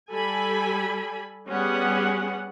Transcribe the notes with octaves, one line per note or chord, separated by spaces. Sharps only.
G3 A4 G#5 B5
G3 B3 C#4 G#4 F#5